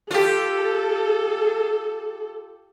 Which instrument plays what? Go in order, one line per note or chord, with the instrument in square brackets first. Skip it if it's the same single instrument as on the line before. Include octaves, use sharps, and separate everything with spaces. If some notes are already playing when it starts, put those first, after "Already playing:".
[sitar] F4 G4 [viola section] A4